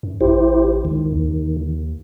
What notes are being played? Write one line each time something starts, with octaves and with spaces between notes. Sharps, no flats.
F#2
A1 E4 G4 C5
C#2 D#3
D#2